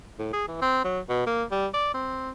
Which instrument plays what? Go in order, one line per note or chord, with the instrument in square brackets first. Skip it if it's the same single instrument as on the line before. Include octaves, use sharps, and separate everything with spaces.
[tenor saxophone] A2
G#4
E3
C4
F#3
B2
A#3
G3
D5
C4